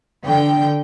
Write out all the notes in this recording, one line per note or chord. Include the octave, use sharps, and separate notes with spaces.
D3 G5